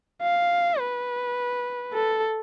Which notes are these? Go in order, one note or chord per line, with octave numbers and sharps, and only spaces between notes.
F5
B4
A4